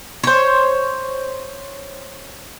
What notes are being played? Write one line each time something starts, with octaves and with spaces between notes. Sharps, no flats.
C5 C#5